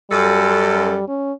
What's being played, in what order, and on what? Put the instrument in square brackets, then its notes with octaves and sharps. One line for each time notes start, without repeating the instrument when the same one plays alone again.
[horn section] F#2 A4 [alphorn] G3
[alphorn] C#4